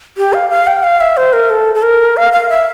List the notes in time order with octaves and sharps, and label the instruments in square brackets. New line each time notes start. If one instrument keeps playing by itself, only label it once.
[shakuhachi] G4
F5
F5
G5
F5
E5
C5
A#4
A4
A4
A#4
F5
F5
E5